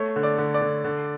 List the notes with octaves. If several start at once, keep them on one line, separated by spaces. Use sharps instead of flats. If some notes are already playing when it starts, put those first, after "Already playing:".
Already playing: A3 C#5
D3
D5
D3
D5
D3
D3